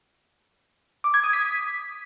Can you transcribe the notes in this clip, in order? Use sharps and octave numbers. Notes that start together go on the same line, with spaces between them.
D6
G#6
D#6
B6